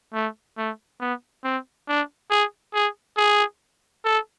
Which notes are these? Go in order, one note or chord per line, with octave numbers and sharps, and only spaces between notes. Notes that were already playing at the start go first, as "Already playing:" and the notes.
A3
A3
B3
C4
D4
G#4
G#4
G#4
A4